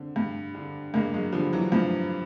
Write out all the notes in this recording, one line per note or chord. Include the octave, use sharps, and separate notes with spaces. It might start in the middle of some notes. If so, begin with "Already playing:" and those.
Already playing: D3 C4
G2
D3
G2 G#3 A#3
F#3 G#3
D3 F3 G3
E3 F#3
G2 F3